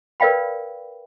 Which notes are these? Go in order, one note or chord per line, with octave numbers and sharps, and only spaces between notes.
A#4 B4 D5 F5 G5 B5